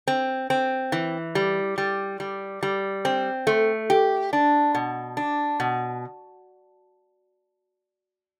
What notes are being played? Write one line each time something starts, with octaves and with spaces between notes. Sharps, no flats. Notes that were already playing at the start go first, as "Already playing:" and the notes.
C4
C4
E3
G3
G3
G3
G3
C4
A3
G4
D4
B2
D4
B2